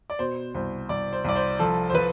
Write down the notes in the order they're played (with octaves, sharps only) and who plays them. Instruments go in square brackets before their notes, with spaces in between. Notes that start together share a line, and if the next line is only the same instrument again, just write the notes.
[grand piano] D5
B2 C5
C2 C5
C2 D5
C5
C2 D5
C5
F3 A4
C5
F3 B4